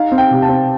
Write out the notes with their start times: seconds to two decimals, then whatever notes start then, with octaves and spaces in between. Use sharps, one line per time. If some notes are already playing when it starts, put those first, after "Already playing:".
Already playing: D#4 F5
0.12 C4
0.18 G5
0.31 C3
0.42 A5
0.49 C4